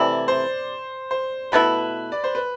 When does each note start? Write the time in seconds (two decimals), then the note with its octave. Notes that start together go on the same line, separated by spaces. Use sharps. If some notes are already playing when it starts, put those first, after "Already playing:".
Already playing: C3 E3 A3 E4 D5
0.28 C5
1.11 C5
1.52 B2 A3 E4 B4
2.12 D5
2.24 C5
2.35 B4